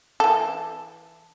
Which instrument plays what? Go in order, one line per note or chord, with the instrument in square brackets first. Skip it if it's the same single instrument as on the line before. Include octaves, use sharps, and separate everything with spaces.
[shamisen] E3 A4